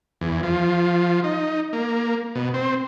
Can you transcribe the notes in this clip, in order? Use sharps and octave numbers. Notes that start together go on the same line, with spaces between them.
E2
F3
D#4
A#3
B2
C4